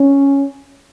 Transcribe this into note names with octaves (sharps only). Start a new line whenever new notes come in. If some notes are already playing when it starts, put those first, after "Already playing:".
Already playing: C#4